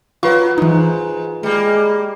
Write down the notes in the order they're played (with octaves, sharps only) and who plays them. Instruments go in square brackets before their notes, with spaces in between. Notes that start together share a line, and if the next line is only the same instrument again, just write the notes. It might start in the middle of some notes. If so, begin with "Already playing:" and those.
[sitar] F#3 [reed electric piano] F4 B4 [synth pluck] C#6
[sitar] G#2 [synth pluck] E3 D#4
[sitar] G3 A#3 [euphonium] G#3